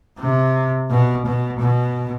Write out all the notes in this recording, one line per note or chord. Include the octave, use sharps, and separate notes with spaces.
C3
B2
B2
B2